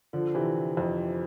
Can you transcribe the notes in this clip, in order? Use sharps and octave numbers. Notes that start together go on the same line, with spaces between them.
D3 F3
C3 E3
F2